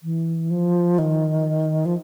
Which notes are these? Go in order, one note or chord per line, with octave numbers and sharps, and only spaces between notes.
E3
F3
D#3
F3